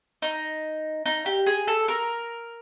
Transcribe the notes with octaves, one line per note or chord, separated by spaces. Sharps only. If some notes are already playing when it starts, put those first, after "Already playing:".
D#4
D#4
G4
G#4
A4
A#4